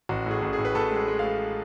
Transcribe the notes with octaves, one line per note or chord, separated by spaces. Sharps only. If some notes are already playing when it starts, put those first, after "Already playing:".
A1 F#4
A2 G#4
A1
G#4
A2
B4
A2 A4
G#3
G#4
G#3
F5
G#3